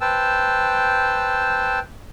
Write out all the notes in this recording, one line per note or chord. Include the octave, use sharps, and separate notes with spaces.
B4 C5 G5 A5 E6